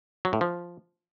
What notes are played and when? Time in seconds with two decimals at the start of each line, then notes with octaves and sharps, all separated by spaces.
0.25 F#3
0.33 A2
0.41 F3